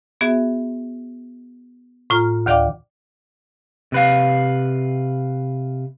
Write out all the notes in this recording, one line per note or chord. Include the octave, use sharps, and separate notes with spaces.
B3 F#4 G#4 E5
A2 F4 A#5 F6
D2 D#3 D5 F5 G5 D6
C3 B4 F5